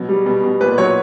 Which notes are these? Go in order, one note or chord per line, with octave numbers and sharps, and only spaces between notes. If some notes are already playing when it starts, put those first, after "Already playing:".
Already playing: B2 F#3
G3
B2
B2
A#2 B4
F#3 C#5